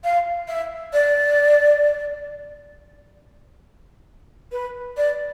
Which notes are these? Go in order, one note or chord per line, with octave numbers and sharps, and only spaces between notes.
F5
E5
D5
B4
D5